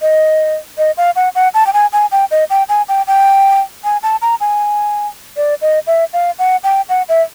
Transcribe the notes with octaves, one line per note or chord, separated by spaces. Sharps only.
D#5
D#5
F5
F#5
F#5
A5
G5
G#5
G#5
G5
D#5
G5
G#5
G5
G5
G#5
A5
A#5
G#5
D5
D#5
E5
F5
F#5
G5
F#5
E5